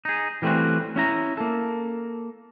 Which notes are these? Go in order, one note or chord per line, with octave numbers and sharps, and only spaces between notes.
D#4 G#4
E3 G3 A3 C4 C#4 F#4
C#4 E4 A#5
A#3 A4